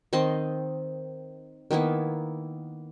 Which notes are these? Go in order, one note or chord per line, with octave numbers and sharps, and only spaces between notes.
D#3 C4 D#5 C6
D#3 A#3 B3 E4